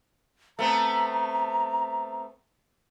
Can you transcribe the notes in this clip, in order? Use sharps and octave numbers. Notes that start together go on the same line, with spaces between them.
A3 B3 C4 A#5